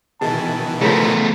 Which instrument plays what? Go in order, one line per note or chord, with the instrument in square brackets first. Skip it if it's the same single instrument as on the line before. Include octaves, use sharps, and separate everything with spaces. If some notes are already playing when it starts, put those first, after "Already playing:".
[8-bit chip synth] B2 D#3 E3 [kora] G#4 [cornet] A5
[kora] C#3 F3 [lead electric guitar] A3 B3 [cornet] A#4